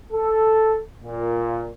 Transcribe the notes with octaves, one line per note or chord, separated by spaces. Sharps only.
A4
A#2